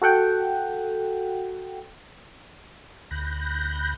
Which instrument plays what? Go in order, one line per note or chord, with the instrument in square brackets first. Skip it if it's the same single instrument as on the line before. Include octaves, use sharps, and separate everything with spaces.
[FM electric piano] F#4 A4 F#5 G5
[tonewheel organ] D2 B5 F#6 G6 A#6